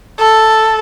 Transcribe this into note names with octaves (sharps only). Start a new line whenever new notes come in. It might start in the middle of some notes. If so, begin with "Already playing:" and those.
A4